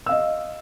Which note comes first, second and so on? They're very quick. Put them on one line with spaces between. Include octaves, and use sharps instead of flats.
E6 F5 D#5